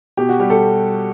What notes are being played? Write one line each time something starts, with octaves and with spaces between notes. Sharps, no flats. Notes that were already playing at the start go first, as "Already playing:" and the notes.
B2 G4
F#4
G3 G4
A4